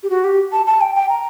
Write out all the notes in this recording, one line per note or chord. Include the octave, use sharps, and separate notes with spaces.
G4
F#4
G4
A5
A5
G5
G5
A#5